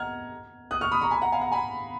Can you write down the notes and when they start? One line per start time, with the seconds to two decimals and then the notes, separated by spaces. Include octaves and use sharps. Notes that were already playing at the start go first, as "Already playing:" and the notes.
Already playing: D#5 F#5 A#5 F6 G#6
0.71 D#6 F#6
0.81 C#6 F6
0.92 B5 D#6
1.01 A#5 C#6
1.11 G#5 B5
1.21 F#5 A#5
1.32 F5 G#5
1.41 F#5 A#5
1.52 G#5 B5